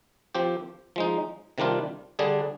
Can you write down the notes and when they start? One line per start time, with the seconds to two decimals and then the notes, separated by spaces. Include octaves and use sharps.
0.35 F3 C4 G4
0.96 F3 G#3 D#4
1.58 C3 D#3 G3 D4 F4
2.19 D3 G3 D4 G#4